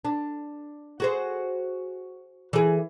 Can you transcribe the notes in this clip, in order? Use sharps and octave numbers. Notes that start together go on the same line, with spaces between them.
D4
F#4 G#4 C5
E3 G#4